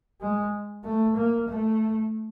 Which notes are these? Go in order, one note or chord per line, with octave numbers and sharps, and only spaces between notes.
G#3
A3
A#3
A3